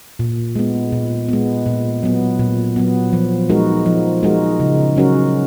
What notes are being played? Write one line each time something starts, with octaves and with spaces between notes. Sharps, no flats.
A#2
G#3 B3
A#2
G#3 B3
A#2
F#3 B3
A#2
F#3 B3
F3
G#3 D#4 F#4 A#4
F3
G#3 D#4 F#4 A#4
C#3
F#3 C#4 F#4 A#4